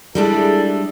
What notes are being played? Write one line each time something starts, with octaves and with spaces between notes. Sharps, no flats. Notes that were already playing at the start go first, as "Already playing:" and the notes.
G3 G#3 D4 E4 G#4 A4